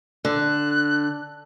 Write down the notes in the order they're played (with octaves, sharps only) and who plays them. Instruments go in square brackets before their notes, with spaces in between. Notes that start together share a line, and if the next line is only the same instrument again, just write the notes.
[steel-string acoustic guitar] D3 [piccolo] F#6